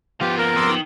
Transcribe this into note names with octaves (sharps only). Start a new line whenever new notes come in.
F3 B3 F4 G4
A#3 A#4
F2 C6 D6 E6
D#3